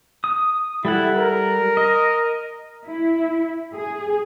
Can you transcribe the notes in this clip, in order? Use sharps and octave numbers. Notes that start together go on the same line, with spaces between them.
D#6
G3 E4 A4 F#5
A#4
D#5
E4
G#4